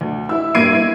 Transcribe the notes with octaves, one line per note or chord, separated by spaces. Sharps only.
D2
E4 E6
G2 A#3 G#6 C7 D7 D#7
E4